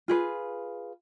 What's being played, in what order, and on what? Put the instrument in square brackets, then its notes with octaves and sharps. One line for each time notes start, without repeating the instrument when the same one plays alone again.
[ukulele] F4 G#4 B4